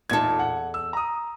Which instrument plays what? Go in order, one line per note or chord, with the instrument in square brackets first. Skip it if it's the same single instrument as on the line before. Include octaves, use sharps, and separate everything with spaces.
[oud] E2 A4 [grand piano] A#2 D#4 G#6
[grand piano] F#5
E6
A#5 D#6